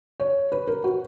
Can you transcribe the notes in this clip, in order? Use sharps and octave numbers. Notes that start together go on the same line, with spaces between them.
C#5
B4
A#4
F#4